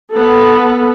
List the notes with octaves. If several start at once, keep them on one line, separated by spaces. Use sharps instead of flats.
B3 A4